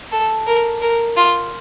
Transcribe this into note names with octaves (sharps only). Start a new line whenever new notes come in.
A4
A#4
A#4
F4